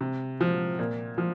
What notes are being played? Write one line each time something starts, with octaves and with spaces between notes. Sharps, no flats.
C3
F3
A#2
F3